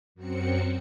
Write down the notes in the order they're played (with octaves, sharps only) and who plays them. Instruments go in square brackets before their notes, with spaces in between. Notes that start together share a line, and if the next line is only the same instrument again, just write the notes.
[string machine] F#2 F#3 C4 C#7